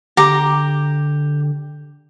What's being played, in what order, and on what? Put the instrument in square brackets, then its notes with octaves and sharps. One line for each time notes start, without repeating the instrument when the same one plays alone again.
[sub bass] D3 [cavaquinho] G4 A#5 D6